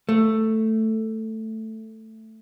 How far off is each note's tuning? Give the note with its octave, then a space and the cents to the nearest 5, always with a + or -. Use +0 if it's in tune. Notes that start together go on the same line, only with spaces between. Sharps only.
A3 +5